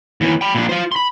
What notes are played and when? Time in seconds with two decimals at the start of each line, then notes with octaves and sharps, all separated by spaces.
0.21 D#2 E3
0.41 G5 B5
0.55 A#2 D4
0.69 F4 C5
0.92 B5 C6